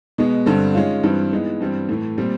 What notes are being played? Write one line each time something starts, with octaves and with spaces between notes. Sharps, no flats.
B2 G#3 B3
G2 D3 G3 C4
D#3 G#3 C#4 F4
G2 E3 G3 C4
E3 G#3 B3 D#4
G2 E3 G3 C4
A2 E3 A3
A#2 G3 C4